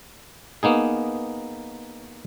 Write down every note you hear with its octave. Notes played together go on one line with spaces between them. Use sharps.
A#3 B3 D#4 G#4